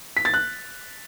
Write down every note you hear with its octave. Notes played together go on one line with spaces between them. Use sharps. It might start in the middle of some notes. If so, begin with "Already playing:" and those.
B6
A6
F#6